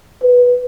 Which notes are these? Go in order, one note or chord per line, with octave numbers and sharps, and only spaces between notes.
B4